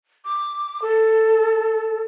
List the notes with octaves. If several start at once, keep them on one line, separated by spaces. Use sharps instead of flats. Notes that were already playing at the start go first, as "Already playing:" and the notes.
D6
A4